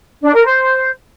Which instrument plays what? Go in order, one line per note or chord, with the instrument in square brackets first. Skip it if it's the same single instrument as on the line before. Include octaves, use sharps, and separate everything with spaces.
[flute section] D4
A#4
C5